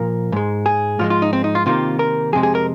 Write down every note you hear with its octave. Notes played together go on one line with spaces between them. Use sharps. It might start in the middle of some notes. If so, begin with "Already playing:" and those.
Already playing: A#2 F3 A#3 A#4
G#2 G#3
G#4
G#2 F3 G#3 F4
F4
D#4
C4
D#4
F4
C3 D#3 A#3 F4
A#4
F2 C3 G#3 G#4
G#4
A#4